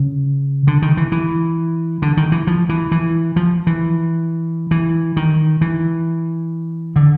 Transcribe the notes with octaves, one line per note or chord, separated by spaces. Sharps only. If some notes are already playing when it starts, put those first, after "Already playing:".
Already playing: C#3
D3
D#3
E3
E3
D3
D#3
E3
F3
E3
E3
F3
E3
E3
D#3
E3
D3